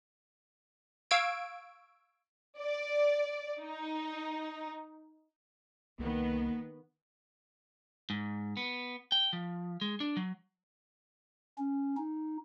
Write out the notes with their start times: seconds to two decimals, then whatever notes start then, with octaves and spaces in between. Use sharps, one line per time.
1.11 F5 C#6 E6 G#6 D7
2.59 D5
3.61 D#4
5.99 C2 D#3 A#3 B3
8.10 G#2
8.57 B3
9.12 G5
9.33 F3
9.81 G#3
10.00 D4
10.17 F#3
11.58 C#4
11.97 D#4